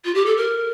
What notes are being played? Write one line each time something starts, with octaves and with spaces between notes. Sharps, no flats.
F4
G4
A4
A#4